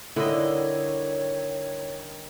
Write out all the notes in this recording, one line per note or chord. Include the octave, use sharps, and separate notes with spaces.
D3 D#3 G3 E4 C#5 D#5 E5